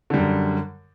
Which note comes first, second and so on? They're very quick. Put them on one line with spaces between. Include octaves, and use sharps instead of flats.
D3 G3 F#2